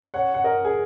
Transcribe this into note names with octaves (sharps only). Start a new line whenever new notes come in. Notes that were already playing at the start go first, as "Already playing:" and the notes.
C#5 F#5
F#5
A#4 D#5
G#4